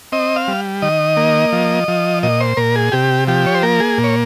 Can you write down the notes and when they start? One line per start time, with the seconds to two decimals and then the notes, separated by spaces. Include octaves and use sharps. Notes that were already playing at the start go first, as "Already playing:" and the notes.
0.12 C4 D#5
0.36 F5
0.48 G3
0.82 D#3 D#5
1.17 A#3
1.53 F3
1.88 F3
2.23 A#2 D#5
2.40 C5
2.57 A#2 A#4
2.76 G#4
2.92 C3 G4
3.28 F3 G4
3.46 C#5
3.54 C5
3.63 A#3 A#4
3.80 G#4
3.98 A#2
4.04 C#5